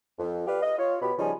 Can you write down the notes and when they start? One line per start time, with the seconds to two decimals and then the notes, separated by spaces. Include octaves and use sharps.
0.19 F2
0.47 G4 B4 D5 F5
0.63 D#5
0.79 F4 C#5
1.01 B2 B3 G4 B5
1.18 C#3 F3 G3 D#4 G#5